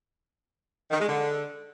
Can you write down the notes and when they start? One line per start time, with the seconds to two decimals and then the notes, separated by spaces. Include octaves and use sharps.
0.91 D#3
0.99 G#3
1.07 D3